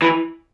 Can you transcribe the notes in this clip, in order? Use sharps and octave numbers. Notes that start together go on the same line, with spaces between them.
E3